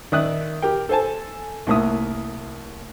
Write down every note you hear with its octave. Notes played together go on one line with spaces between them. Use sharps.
D#3 D5 E5 D#6 F#6
G4 A#4 G5
A4 C5 G#5 A5
C2 A2 A#3 E5 D#6